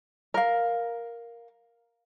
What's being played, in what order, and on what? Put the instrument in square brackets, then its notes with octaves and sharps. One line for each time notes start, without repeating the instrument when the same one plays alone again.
[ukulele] A#4 F5